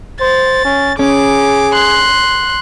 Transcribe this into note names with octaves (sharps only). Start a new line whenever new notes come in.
C5 A6
C#4
C#4 G#4 D6
C6 F#6